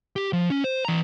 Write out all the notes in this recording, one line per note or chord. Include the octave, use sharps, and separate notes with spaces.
G4
F3
C#4
C5
E3 A#5